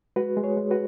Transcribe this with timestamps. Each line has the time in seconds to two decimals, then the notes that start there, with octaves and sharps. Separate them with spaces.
0.16 G#3 F#4 B4
0.37 G#3
0.43 G#4 C#5
0.57 G#3
0.71 F#4 B4